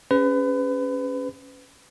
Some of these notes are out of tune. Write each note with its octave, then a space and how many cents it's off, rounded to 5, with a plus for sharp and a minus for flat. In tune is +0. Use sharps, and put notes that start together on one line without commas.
C#4 +0 G#4 -25 B4 +30